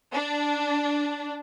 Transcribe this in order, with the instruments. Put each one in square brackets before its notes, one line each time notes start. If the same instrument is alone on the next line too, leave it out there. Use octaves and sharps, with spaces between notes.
[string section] D4